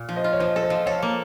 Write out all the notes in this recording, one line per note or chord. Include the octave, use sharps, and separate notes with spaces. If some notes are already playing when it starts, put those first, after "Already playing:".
Already playing: A#2
F3
C5 D#5
F4
C#5
F3 C5 D#5
A4
C5 D#5
F3
A4 C#5 F5
A#3